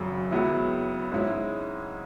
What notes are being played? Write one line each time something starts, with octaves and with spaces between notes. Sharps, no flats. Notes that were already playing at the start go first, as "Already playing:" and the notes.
Already playing: G#1 F#2 C#3 F#3
C#2 C#3 F#3 B3 E4
G#2 G#3 C#4 E4